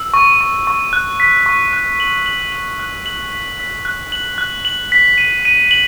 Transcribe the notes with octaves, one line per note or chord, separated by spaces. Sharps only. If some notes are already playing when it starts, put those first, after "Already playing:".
Already playing: E6
C#6
C#6
C#6
F#6
B6
C#6
F#6
F#7
F#7
F#7
F#6
F#7
B6
B6
F#6
F#7
F#6
F#7
B6
D#7
D#7
F#7